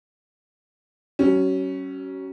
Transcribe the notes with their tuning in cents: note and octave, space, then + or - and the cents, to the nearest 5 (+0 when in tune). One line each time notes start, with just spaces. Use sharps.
F#3 +40 C#4 +0